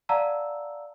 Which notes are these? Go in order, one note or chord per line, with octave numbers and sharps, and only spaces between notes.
D5 F5 F#5 A5 A#5 E6